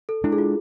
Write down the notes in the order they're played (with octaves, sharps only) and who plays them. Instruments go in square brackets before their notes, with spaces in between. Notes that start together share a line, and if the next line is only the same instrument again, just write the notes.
[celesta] A4
[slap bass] G#3 D4 [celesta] E4
[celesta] G#4
F4